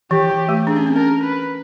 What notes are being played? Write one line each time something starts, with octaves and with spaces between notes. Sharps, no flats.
E3 G4
E3
A3
D4 G#4
C#4
C4
C#4 A#4
B4